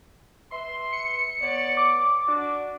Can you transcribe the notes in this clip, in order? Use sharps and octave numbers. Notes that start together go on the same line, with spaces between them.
B4 E5 C6
C#7
B3 C#5 D5
D6
D4 F#4